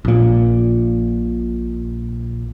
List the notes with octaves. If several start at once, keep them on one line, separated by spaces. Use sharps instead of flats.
A#1 A#2